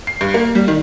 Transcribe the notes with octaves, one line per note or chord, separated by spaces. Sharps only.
C7
G2
A#3
G3
D#3